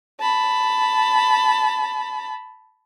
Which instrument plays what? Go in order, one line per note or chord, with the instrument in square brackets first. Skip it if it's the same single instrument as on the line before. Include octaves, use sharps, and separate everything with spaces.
[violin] A5 B5